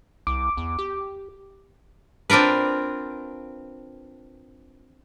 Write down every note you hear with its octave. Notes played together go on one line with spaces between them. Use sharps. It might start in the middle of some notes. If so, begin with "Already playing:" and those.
C2 D6
E2
G4
C4 D4 F4 A#4 B4